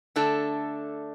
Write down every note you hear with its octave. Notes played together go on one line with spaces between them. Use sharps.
D3 A3 D4 A4